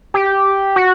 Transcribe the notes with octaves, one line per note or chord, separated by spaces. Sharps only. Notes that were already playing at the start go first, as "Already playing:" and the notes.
G4
F#4